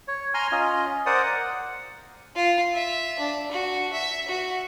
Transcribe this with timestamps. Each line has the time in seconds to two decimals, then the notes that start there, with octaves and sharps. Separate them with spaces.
0.08 C#5
0.34 G#5 A#5 C6 F6
0.52 C#4 F4 D#5
1.06 A#4 C5 D5 F#5 D#6
1.22 F#5
2.36 F4
2.74 E5
3.19 D4
3.52 F#4
3.93 E5
4.28 F#4